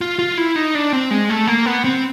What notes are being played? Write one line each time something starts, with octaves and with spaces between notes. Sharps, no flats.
F4
F4
E4
D#4
D4
C4
G#3
A3
A#3
B3
C4